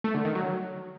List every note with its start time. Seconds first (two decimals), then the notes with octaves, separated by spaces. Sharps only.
0.04 A3
0.15 D3
0.25 D#3
0.35 F#3